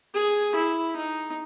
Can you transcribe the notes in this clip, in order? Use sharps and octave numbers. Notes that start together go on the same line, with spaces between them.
G#4
E4
D#4